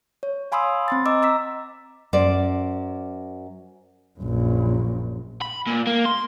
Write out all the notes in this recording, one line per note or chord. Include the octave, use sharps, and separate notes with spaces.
C#5
F5 G#5 B5 C6 D#6 E6
C4 C6 A6
D#5 A#5 D6 E6
A#5 E6 B6
F#2 C5 D5
A#1 F#2
B5
A#2
A#3
C6